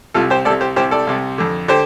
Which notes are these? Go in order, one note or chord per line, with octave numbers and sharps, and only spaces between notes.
C2 C3 F4 A4
G4 C5
C2 C3 A4 D5
G4 C5
C2 C3 G4 C5
A4 D5
C2 C3
F2 D3
D3 G4 C5